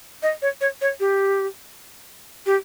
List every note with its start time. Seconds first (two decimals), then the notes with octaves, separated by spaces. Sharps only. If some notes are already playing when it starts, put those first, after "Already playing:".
0.23 D#5
0.42 C#5
0.61 C#5
0.81 C#5
1.00 G4
2.46 G4